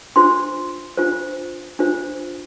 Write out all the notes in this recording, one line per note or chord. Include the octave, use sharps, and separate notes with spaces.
D4 F4 C5 C6
D4 F4 C5
D4 F4 C5